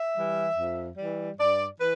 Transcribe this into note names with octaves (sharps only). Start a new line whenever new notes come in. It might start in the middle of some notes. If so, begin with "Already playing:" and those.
Already playing: E5
E3 G3
F2
E3 G3
G2 D5
E3 B4